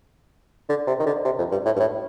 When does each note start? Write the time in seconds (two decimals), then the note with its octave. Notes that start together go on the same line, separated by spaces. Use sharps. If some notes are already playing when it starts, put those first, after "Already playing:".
0.69 D3
0.87 C3
1.00 D#3
1.06 D3
1.25 C3
1.38 F2
1.52 G2
1.65 A2
1.76 G2
1.80 A2